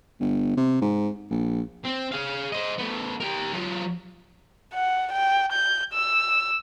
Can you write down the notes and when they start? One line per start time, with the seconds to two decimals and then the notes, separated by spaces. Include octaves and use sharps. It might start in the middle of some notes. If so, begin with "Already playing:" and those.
0.20 G1
0.57 C3
0.82 G#2
1.31 A#1
1.84 C4
2.12 G#4 F5
2.52 C5 D#5
2.79 A3 B3
3.20 G4 A#4
3.53 F#3 F4
4.74 F#5
5.13 G5
5.52 G6
5.93 E6